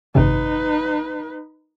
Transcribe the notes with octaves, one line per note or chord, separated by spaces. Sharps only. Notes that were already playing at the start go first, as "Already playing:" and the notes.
G#1 F#2 C3 D#4 B4